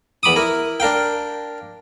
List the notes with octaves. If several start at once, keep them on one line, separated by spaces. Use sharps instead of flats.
E2 B5 D6 D#6
E4 A#4
D4 A#4 F5 G5